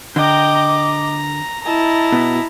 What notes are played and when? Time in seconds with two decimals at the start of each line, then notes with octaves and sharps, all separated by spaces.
0.16 D3 D#5 G5 A#5 D6
0.71 A#5
1.64 E4 D#5 A5 A#5
2.12 B2